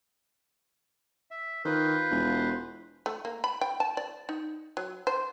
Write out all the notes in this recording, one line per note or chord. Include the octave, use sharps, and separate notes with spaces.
E5
D#3 F4 B4 C5
E1
A3
A#3
B5
G5
A5
D5
D#4
F#3
C5